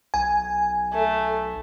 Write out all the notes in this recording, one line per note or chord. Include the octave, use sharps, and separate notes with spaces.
B1 G#5
A3